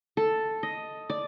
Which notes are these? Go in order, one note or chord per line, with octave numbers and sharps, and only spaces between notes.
A4
D#5
D5